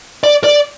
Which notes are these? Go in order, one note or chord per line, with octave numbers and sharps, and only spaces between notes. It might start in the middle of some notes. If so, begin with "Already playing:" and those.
D5
D5